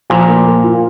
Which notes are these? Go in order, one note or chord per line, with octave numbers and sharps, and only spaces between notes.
A#2 F3
A#3
A#3
F4